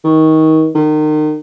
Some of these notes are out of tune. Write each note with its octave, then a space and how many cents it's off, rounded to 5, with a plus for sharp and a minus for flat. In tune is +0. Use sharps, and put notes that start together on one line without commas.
D#3 +25
D#3 -30